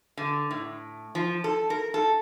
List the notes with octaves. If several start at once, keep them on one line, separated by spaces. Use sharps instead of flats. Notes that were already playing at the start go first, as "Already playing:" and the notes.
D3
A2
F3
A4
A#4
A4